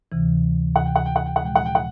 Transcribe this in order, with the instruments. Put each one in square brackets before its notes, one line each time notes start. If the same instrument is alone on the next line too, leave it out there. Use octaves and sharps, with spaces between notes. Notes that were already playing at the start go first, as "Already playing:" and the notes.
[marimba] D2 C3 E3
[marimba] D2 C3 E3 [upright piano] F#5
[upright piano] G5
F#5
G5
F#5
G5
F#5
[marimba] A#2 F3 G#3 [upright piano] G5
[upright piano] F#5
G5
F#5